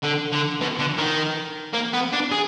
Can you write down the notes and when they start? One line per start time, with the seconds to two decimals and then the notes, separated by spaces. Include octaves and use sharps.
0.03 D3
0.32 D3
0.61 B2
0.79 D3
0.98 D#3
1.74 A#3
1.94 B3
2.13 D4
2.32 G#4